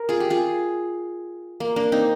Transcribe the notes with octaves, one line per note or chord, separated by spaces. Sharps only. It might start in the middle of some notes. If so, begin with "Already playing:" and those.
Already playing: A#4
F4 G#4
G4
F4 G#4
A#3
A#3 D4
C4 D#4